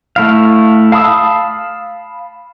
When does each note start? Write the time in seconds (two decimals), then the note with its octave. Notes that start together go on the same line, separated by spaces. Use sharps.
0.16 A3 E4 F5
0.92 F5 A5 B5 D#6 E6